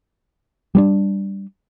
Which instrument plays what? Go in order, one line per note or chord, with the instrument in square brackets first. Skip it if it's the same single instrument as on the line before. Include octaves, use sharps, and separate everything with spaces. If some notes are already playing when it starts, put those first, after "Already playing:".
[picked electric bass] G3 B3 D4